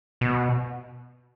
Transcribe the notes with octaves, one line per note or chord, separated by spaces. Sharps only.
B2